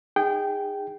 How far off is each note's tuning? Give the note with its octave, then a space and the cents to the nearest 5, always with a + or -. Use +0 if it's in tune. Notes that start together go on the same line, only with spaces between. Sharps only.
D#4 +0 G#4 -30 G5 -15